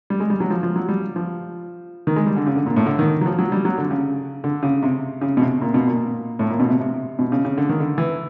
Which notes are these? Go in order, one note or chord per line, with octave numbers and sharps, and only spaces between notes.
G3
G#3
G3
F#3
F3
F3
F#3
G3
F3
D#3
G#3
G3
D3
C#3
D3
A#2
A2
D3
D#3
F#3
F3
F#3
G3
F#3
D3
C#3
D3
C#3
C3
C#3
B2
C3
A#2
B2
A#2
A2
A#2
B2
C3
C3
B2
C#3
C#3
D3
D#3
D3
E3